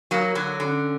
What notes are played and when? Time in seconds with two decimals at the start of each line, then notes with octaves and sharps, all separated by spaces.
0.11 F#3 A#3
0.35 D3 F#3
0.59 D3 C#4